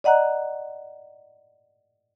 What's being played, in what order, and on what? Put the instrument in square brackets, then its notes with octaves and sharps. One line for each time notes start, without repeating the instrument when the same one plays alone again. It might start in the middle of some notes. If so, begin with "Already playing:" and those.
[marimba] D5 D#5 F#5 A#5 F#6